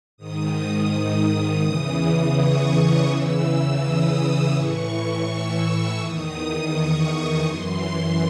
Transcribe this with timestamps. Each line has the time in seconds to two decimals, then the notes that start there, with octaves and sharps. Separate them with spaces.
0.17 G#2 D#3 D#6
0.90 D#6
1.62 E2 C#3 E3 D#6
2.36 C#6
3.08 E2 C#3 E3 E6
3.81 D#6
4.53 A2 E3 C#6
5.26 E6
5.99 E2 D#3 D#6
6.71 C#6
7.44 F#2 E3 C6